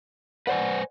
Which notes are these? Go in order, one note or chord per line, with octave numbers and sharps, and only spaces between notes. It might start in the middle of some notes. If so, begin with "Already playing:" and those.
B4 C5 D5 F#5 G#5